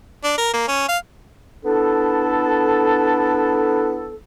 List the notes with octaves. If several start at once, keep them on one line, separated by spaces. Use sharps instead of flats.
D4
A#4
A#3
C#4
F5
B3 D4 E4 A4